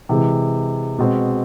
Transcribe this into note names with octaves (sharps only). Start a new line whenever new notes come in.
C3 E3 G#3
B2 G#3 C4